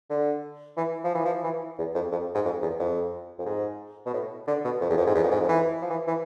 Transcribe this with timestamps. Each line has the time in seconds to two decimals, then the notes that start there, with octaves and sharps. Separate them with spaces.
0.10 D3
0.77 E3
1.04 F3
1.15 E3
1.25 F3
1.44 E3
1.78 E2
1.95 F2
2.12 F2
2.35 G#2
2.45 F2
2.62 E2
2.79 F2
3.39 F2
3.46 G#2
4.06 B2
4.14 A2
4.48 D3
4.65 B2
4.81 F2
4.89 E2
4.98 F2
5.07 G#2
5.15 E2
5.23 F2
5.31 G#2
5.40 F2
5.49 E3
5.82 F3
5.90 E3
6.08 E3